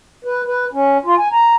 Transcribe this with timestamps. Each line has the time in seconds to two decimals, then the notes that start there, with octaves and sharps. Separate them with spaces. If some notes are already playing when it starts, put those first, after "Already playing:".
0.25 B4
0.46 B4
0.73 C#4
1.05 F4
1.18 G#5
1.32 A#5